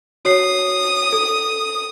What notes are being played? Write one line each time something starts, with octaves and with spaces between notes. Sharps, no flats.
F#4 C#5 D#6 C7
A4